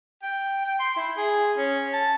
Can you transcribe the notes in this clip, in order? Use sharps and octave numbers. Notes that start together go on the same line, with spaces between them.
G5
G5
C6
E4
G#4
C#4
A5